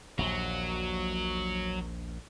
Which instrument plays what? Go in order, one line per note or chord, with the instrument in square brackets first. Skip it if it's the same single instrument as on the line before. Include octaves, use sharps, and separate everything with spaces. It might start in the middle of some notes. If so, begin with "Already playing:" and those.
[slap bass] A#1 D#2 A#2 [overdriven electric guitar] F#3